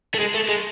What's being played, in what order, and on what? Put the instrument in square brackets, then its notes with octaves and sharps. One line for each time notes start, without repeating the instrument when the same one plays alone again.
[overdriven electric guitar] A3
G#3
A3
G#3